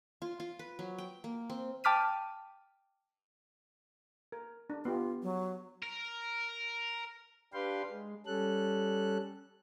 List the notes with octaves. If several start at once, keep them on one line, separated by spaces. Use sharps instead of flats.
F4
F4
B4
F#3
G5
A#3
C4
G5 A5 D6 F6 B6 D#7
A#4
D4
B3 F4 G4
F#3
A#4
D4 G4 B4 F5 G5 C6
G#3
G3 C#4 A4 F#6